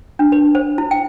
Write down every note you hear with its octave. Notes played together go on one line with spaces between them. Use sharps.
D4
B4
C5
E4
G5